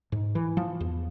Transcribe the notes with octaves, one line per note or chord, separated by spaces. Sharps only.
G#2
E3
F3
E2